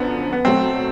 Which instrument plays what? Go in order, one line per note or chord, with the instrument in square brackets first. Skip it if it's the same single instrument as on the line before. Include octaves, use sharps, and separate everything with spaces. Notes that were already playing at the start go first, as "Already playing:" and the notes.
Already playing: [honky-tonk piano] F#2 D3 F3 [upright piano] B3
[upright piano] B3
[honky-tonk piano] B2 F#3 A3 [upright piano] C4